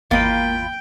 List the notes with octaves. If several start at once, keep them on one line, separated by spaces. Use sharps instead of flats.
G#1 E2 A#3 F4 D#5 G5 B5